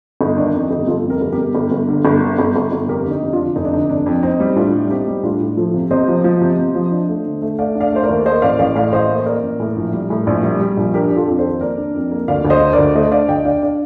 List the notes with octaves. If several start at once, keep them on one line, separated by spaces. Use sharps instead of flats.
G1 D#4
D#3 D4
F2 D#4
G1 D#4 G4
G1 F4 A4
F2
G4 A#4
G1
G4 A#4
G1
G1
G1
D3
G1
D3
G1
G1
G1
F1 G4 A#4
D3
D#4 G4
F1
D4 F4
D3
F1 D#4
D4
D3 D#4
F1 D4
F2
C4 D#4
G3
A2 D4 F4
G3
C4 D#4 G4
G3
A2 D4 F4
A2
F3 F4 A4
C3
C3 C5 D#5
F3
F3
C3
C3
F3
D4
A3
D3
A3
A3 D5 F5
D4
D5 F5
A3 C5
A#4 D5
D#2
A#3 C5 D#5
A1 D5 F5
A1 D5 F5
A2 D5 F5
A1 C5 D#5
A#3
A#3 A#4 D5
A1
A2
A#1
G3
A2
A#1
G3
G3
A#1
D4 G4 A#4
D4
F4 A4
F2
A4 C5
D#3
A#3 A#4 D5
D4
F2
A#3
D2 D5 F5
D2
C5 D#5
D4
A#4 D5
D2
A3 C5 D#5
D4 D5 F5
D2 D#5 G5
D4 D5 F5
D4 D5 F5